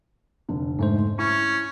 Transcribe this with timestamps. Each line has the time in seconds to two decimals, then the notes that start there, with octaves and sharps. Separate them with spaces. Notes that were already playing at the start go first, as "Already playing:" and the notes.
0.49 F1 D3
0.79 G#2 A3 C5
1.19 C#4 E4 C#6